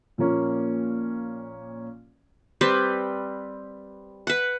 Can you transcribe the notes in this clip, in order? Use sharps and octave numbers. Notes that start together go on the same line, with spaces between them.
A#2 F3 A#3 C#4
G3 C4 B4
B4 F#5